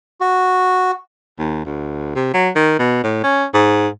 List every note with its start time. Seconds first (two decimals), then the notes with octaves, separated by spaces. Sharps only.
0.21 F#4
1.39 D#2
1.65 D2
2.16 C3
2.34 F#3
2.55 D#3
2.79 B2
3.04 A2
3.24 C#4
3.54 G#2